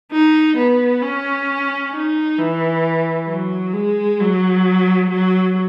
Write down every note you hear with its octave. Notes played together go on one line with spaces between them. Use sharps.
D#4
B3
C#4
D#4
E3
F#3
G#3
F#3
F#3